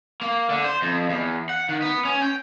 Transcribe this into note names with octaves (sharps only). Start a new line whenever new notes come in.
A#3
D3
C5
F2
E2
F#5
D#3
B3
C#4
G5